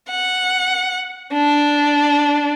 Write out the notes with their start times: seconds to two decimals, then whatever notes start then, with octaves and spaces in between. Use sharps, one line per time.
0.10 F#5
1.33 D4